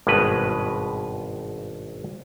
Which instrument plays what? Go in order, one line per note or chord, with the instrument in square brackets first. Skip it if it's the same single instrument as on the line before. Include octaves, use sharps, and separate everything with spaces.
[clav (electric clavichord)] G#1 G2 B2 G#3 B4